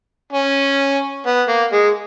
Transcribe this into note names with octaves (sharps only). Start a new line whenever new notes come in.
C#4
B3
A#3
G#3